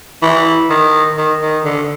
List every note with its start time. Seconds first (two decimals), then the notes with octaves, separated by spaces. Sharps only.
0.22 E3
0.70 D#3
1.17 D#3
1.41 D#3
1.64 D3